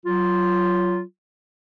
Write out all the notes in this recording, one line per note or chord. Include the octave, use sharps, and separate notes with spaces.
F#3 F4